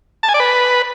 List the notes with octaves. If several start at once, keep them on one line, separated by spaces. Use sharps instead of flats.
A5
G#5
D5
B4